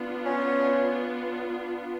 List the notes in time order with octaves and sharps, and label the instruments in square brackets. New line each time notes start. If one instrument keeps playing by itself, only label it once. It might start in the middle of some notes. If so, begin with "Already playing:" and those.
Already playing: [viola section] B3 D4 F4
[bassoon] C#4